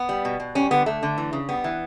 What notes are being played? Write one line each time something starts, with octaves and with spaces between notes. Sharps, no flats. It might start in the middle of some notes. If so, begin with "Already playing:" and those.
Already playing: B3
G3
B2
B2
G3 C#4
D3 B3
D3 A3
D3
E3
C#3
G3 B3
E3